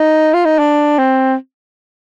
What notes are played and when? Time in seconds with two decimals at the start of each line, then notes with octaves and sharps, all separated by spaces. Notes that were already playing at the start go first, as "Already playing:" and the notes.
Already playing: D#4
0.34 F4
0.45 D#4
0.59 D4
0.99 C4